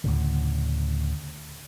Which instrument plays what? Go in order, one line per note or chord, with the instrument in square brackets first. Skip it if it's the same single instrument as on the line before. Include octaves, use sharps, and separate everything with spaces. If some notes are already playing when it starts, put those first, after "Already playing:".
[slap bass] D2 A2 C#3